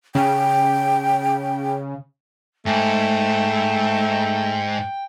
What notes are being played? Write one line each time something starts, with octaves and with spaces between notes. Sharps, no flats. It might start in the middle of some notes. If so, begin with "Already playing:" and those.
C#3 G5
G#2 A3 G5